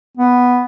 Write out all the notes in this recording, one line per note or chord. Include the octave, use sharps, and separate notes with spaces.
B3